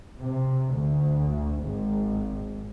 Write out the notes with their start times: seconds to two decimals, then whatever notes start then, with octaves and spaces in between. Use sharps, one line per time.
0.20 C3
0.74 D2
1.64 G#1